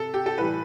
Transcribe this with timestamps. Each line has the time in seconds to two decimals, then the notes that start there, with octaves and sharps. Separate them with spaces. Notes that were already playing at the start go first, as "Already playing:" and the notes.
Already playing: C3 A4
0.14 G4
0.26 A4
0.38 A2 E3 G3 B4